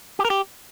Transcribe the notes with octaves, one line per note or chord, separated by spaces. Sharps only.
G4
A#4
G4